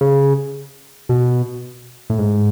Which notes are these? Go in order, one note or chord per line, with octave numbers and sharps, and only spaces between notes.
C#3
B2
A2
G#2